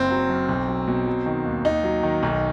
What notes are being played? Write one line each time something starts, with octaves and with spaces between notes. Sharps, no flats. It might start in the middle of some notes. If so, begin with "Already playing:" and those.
Already playing: F#1 C4
F#3
F#2
B1
F#3
B2
F#3
D#3
D#2
D#2 D#4
F#3
D#3
B1